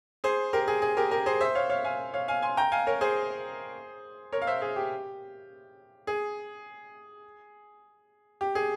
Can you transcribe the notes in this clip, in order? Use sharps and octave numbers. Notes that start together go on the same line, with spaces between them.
G#4 C5
G4 A#4
G#4
G#4
G4 A#4
G4 A#4
G#4 C5
C5 E5
C#5 F5
C#5 F5
F5 G#5
C#5 F5
F5 G#5
G#5 C6
G5 A#5
F5 G#5
A#4 C#5
G#4 C5
A#4 C#5
F5
C5 E5
G#4
G4
G#4
G4
G#4